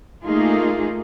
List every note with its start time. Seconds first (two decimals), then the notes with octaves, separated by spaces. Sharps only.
0.25 A3 A#3 D#4 F4 G#4